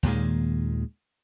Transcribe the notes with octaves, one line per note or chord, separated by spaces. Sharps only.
D#2 A#2 D#3 G#3